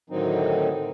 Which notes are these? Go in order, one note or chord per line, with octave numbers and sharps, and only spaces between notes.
A2 D3 D#3 F#3 C4 D#4